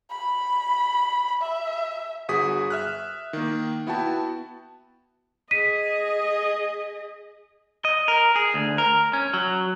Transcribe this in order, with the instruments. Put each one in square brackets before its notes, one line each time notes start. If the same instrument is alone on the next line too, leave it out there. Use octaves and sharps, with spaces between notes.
[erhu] B5
E5
[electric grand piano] G1 F#4 G#4 D#6 B6
E5 F6 F#6
D#3 A#3
B3 E4 F#4 G5 A5
[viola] G#4 D#5 [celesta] B6 D#7
[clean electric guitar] D#5
A#4
G#4
D2
A#4
C#4
F#3